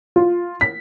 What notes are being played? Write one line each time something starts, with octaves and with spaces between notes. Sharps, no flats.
F4
B6